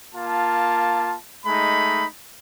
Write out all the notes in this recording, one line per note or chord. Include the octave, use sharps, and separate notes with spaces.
A#3 F4 A5
G#3 A3 D#4 B5